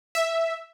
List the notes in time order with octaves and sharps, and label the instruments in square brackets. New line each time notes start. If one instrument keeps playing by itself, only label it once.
[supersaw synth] E5